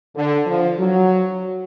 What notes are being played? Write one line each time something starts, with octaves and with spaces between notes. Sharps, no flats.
D3
F3
F#3